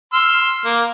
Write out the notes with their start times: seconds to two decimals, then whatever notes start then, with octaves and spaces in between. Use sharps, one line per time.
0.13 C6 E6 F6
0.65 A#3